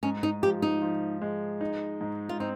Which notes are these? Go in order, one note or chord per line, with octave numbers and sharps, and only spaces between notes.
G#2 C#4
D#4
F3 G4
D#4
F3
G#3
D#4
G#2
F4
C4 D#4